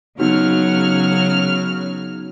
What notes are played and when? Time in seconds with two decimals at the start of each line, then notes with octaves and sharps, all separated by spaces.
0.20 C#3 F#3 B3 D#4 F#4 F6